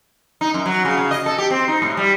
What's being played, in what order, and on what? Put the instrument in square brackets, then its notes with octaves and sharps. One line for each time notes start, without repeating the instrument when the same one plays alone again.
[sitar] D#4
F#2
F#3
C#3
C#3
D#5
A4
G4
C4
D#4
A2
G3